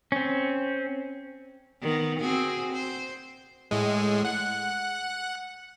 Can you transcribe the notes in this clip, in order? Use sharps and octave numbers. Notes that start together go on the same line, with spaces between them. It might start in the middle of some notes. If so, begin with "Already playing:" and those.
C4 C#4
D#3 B3
C4 F#4 G#4
C5
A2 G#3
F#5